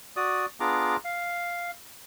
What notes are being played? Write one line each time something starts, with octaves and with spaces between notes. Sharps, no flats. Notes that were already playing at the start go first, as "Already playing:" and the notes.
F#4 D5 D#6
B3 D4 F4 G#4 A#5 D6
F5